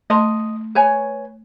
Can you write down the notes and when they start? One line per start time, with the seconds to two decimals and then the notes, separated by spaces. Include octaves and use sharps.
0.10 A3 D#5 A5 C6
0.75 B4 C#5 G#5